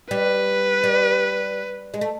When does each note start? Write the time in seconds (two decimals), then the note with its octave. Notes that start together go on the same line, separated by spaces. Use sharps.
0.11 G3 B4
0.84 G3
1.94 G#3
2.01 A3